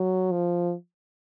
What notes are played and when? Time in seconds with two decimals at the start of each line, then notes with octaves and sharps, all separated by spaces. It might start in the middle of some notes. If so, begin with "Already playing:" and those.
Already playing: F#3
0.32 F3